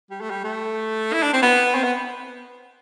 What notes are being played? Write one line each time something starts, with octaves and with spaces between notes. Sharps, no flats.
G3
A3
G3
A3
E4
D4
C4
B3
C4
B3